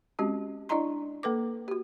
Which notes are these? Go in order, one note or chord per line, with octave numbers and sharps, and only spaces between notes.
G#3 C4 C#4 F#4 G4
D4 E4 D5 D#5 A#5 C6
A#3 A4 B4 D6
F#4 G4